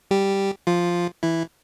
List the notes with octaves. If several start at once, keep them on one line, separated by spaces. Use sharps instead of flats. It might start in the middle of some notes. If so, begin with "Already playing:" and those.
G3 G4
F3 F4
E3 E4